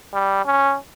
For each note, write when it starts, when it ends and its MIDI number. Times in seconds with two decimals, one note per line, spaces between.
0.14 0.41 55
0.45 0.75 61